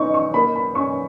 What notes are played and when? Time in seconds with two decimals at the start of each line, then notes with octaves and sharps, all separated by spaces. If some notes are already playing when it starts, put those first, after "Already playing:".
Already playing: B3 D#4 C#6
0.14 C#6
0.34 A#3 B5
0.56 B5
0.75 C#4 C#6